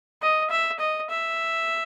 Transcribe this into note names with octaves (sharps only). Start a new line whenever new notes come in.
D#5
E5
D#5
E5